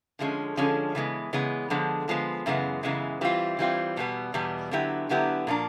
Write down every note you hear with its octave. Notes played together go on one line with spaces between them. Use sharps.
D3 F3 G#3 C#4
D3 F3 G#3 C#4
C#3 E3 G#3 B3
C#3 E3 G#3 B3
D3 F3 G#3 B3
D3 F3 G#3 B3
F#2 C#3 E3 G#3 B3
F#2 C#3 E3 G#3 B3
E3 G3 C4 F4
E3 G3 C4 F4
E2 B2 G3 B3
E2 B2 G3 B3
D3 F#3 B3 E4 G4
D3 F#3 B3 E4 G4
A#2 F3 A#3 D4